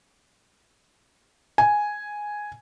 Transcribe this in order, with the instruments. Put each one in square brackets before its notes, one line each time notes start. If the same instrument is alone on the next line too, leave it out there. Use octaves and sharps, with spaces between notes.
[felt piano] G#5